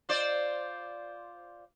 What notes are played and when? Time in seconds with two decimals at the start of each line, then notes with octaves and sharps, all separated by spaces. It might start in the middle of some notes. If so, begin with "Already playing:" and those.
0.09 F4 C5 D5